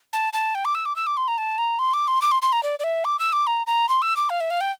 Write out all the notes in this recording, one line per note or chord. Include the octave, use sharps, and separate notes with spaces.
A5
A5
G5
D6
E6
D6
E6
D6
C6
A#5
A5
A#5
C6
D6
C6
D6
C6
C6
A#5
D5
D5
E5
D6
E6
D6
A#5
A#5
C6
E6
D6
F5
E5
F5
G5